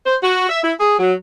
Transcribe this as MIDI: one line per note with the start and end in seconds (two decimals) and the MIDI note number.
0.06 0.17 72
0.23 0.47 66
0.49 0.60 76
0.63 0.73 64
0.80 0.95 68
0.99 1.13 54